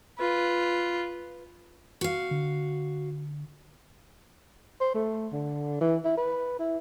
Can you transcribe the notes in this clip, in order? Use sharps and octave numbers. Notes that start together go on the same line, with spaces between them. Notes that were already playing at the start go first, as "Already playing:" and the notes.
F4 B4
F#4 F5
D3
C5
A3
D3
E3
E4
B4
E4